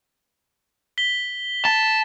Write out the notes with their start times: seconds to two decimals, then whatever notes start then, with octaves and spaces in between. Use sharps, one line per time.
0.98 B6 G7
1.65 A5 A6